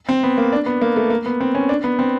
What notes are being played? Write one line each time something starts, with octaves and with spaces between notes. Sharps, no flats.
C4
B3
A#3
D4
B3
A#3
A3
A#3
B3
C4
C#4
D4
B3
C4